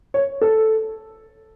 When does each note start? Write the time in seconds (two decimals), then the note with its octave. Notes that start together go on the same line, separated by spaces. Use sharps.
0.14 C#5
0.41 A4